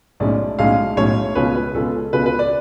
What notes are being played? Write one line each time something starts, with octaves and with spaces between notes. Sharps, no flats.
B1 A2 G#3 C#4 D5
B1 A2 G#3 C#4 F5
B1 A2 G#3 C#4 C#5
C#2 B2 G#3 C#4 F4 B4
B4
C#2 B2 G#3 C#4 F4 A4
C#2 B2 G#3 C#4 F4 B4
B4
D5